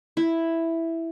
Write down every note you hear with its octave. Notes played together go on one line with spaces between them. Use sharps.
E4